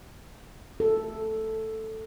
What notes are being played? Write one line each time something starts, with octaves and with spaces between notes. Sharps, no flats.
A4